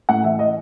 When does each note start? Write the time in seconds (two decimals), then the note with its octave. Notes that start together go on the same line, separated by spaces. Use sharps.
0.09 A2 F#5
0.24 E3 E5
0.39 E3 D#5